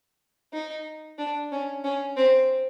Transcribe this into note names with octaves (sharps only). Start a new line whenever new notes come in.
D#4
D4
C#4
C#4
C4